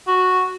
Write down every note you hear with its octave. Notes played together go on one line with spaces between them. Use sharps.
F#4